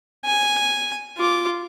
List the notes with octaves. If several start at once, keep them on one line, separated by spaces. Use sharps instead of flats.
G#5
F4 D6